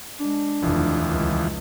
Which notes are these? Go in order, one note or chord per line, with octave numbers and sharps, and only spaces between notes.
G#3 D4
F1 D#2 E3 F3
C#2